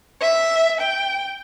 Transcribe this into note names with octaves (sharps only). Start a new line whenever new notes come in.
E5
G5